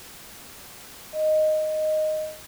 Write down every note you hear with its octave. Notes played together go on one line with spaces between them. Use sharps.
D#5